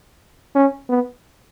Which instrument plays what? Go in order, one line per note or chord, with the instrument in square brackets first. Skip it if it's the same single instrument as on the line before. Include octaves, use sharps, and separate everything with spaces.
[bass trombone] C#4
B3